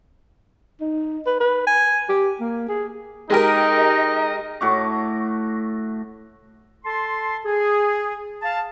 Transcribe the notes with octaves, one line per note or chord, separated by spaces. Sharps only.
D#4
B4
B4
G#5
G4
A#3
G#4
G#3 D#4 G4 A#4 D#5
A2 F#4 D6
A4 A5 C6
G#4
F5 A5